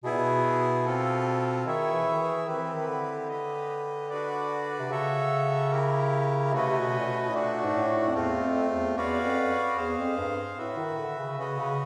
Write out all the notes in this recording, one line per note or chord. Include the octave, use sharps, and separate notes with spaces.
B2 B3 E4 G#4
A#2
B2
C4 F4 A4
D#3 E4 G#4 C#5 E5
E3
D#3
E3
D#3 C4 E4 G4 B4
E3
D#3
D3
G4 B4 D#5
D4 F#4 B4 D5
C3
C#3 F#4 A4 C#5 E5
E4 G4 A#4
C3 A3 C#4 F#4 B4 D#5
C3
B2
A#2
B2
A2
A#2 A3 D4 F#4
G#2
A2
F2
E2 A3 C4 F4
F2
E2
E2 C#4 F#4 B4 D5 F5
F2
E2 G#4 C5 F5
F2
G2
A2 F#4 B4 E5
D#3
D3
C#3
C#3 C#4 F#4 B4 D#5
C#3